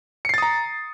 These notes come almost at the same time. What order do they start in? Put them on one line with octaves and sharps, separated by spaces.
C#7 C7 A6 D#6 A#5